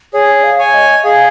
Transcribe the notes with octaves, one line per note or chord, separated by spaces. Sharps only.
G#4 C#5
F5
C#5 G#5
D#5
G#4 F5